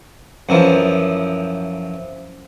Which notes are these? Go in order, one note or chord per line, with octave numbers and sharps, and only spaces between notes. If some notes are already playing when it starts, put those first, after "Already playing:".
F#2 E3 F3